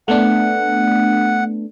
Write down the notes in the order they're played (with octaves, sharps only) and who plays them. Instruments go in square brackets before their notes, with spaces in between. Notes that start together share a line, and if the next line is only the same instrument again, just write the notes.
[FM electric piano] A3 B3 D4 [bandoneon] F#5